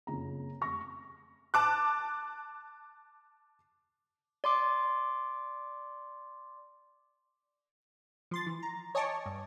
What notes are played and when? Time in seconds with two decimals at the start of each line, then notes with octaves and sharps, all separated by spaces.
0.07 F#1 F2 C#3 A#5
0.62 F1 C#6 A#6
1.54 A5 D6 F#6
4.44 D5 C6 D6
8.31 F3 C6 A6
8.46 E3
8.63 A#5
8.95 C#5 D#5 G#5 A5 C#6 D6
9.26 G2